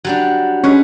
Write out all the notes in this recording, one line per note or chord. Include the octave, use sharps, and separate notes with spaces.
F#3 G3 D4
G#3 C#4 B4